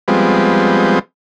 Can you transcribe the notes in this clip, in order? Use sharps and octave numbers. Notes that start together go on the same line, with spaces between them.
F3 G3 G#3 B3 C4